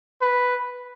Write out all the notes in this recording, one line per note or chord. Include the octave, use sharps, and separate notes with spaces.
B4